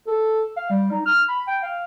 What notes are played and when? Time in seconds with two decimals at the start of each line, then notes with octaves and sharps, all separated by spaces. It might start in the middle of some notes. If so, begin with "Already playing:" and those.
0.07 A4
0.57 F5
0.70 G3
0.91 D#4
1.06 F6
1.28 B5
1.47 G5
1.63 F5